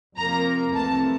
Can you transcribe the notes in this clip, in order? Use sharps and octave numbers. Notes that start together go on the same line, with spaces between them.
F2 C3 F3 A#3 A#5
C2 C3 E3 A3 A5